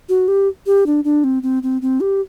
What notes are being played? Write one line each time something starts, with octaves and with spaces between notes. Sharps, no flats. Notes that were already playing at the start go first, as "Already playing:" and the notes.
F#4
G4
G4
D4
D4
C4
C4
C4
C4
G4